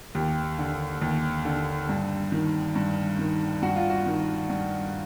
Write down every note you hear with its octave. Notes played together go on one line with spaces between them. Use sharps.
D#2 G4
D3
D#2
D3
G2
D#3
G2
D#3
G2 F#4
F4
F#4
D#3
G2